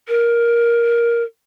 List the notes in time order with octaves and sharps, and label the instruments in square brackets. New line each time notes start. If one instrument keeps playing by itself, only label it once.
[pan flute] A#4